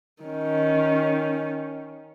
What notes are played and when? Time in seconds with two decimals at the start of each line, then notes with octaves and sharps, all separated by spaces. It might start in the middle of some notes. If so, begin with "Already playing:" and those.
0.23 D#3 C#4